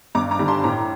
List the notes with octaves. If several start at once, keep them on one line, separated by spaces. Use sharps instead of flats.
G2 A#5 D6
A#5 D6
D3 G3
A5 C6
C6
A2 A#5 D6